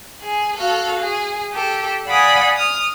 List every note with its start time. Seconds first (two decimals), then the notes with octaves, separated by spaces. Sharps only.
0.22 G#4
0.56 F#4 A4 F5
1.00 G#4
1.52 G4 A4
2.07 D5 F5 F#5 G#5 B5 D#6
2.57 D#6 F6